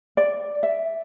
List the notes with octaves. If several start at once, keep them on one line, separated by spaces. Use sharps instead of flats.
D5
E5